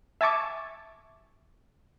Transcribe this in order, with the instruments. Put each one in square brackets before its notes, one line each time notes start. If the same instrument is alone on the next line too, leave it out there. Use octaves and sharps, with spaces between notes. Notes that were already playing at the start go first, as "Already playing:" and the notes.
[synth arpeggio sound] E5 G#5 A5 C#6 D6